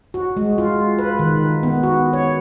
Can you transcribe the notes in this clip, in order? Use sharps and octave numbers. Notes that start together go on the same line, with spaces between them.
F#4
G#3
F4
B4
D#3
B3
F#4
C#5